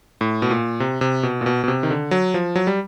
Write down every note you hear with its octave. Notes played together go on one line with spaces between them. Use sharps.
A2
B2
A#2
C3
C3
B2
A#2
B2
B2
C3
D#3
D3
F#3
F3
F#3
G3